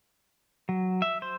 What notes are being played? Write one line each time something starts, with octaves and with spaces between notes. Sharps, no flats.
F#3
E5
C5